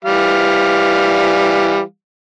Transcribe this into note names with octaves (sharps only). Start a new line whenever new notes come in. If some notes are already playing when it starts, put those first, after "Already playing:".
E3 G3 F5